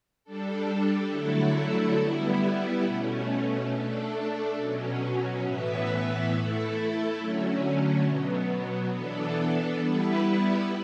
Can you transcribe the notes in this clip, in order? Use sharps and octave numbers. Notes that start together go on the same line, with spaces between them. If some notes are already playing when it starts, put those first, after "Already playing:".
G3 D4 A4
D3 F#3 A3 E4 A4
G3 B3 E4
B2 A3 C#4
A3 D4 A4
B2 F#3 C#4
A2 E3 B3 E4 B4
A3 E4 A4
D3 F#3 A3 C#4
B2 F#3 B3
E3 B3 D4 A4
G3 B3 E4 B4